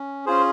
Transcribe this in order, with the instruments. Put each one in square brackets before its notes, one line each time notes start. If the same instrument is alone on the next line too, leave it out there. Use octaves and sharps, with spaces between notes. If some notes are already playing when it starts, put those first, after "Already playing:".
Already playing: [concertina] C#4
C#4 F4 G#4 C5